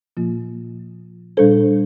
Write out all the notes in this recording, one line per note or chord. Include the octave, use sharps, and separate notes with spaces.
A#2 F3 A#3 F4
A#2 G3 D4 A4 C5